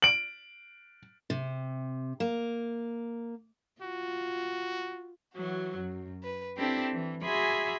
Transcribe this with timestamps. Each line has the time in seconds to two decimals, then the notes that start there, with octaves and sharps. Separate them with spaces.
0.02 D7 F#7
1.30 C3
2.20 A#3
3.82 F4 F#4
5.34 E3 F#3 F#4
5.78 F#2
6.23 B4
6.57 C4 D4 E4 G4 A4
6.93 E3
7.24 F#4 G#4 E5 G#5 B5 C6